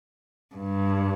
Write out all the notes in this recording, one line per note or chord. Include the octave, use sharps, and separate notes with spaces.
G2